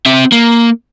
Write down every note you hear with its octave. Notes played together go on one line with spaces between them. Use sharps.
C4 E5
A#3